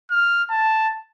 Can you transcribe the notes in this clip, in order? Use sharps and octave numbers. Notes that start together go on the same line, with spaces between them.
F6
A5